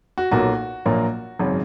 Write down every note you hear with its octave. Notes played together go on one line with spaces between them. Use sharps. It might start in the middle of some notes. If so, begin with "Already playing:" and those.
F#4
B1 A#2 F#3 A#3 F#4
A#1 A#2 F#3 A#3
G#1 F#2 C#3